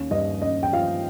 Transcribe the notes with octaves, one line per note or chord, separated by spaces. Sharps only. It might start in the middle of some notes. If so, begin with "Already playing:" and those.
Already playing: D#2 C#4
G2 D#5
C#4 D#5
G5
F3 F5